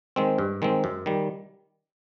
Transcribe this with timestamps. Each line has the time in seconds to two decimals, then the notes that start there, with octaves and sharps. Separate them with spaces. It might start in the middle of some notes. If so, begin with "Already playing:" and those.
0.16 D#3 G#3 C4
0.38 G2
0.62 D#3 G#3 C4
0.84 F#2
1.06 D#3 G3